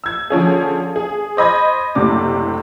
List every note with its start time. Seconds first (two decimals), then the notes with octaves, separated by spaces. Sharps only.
0.04 E6 G#6
0.30 D3 F3 C#4 G#4
0.96 G#4
1.37 C5 D#5 B5 G#6
1.95 F#1 A2 C3 D4 D6